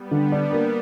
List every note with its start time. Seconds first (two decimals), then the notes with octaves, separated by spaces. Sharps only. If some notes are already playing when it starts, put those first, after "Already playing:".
Already playing: G3 B3
0.11 D3
0.32 D4
0.52 A#3